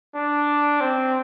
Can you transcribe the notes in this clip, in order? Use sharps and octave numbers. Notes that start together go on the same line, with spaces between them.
D4
C4